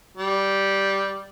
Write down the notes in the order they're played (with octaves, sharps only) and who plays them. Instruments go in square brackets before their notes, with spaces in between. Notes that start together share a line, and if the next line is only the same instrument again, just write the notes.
[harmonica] G3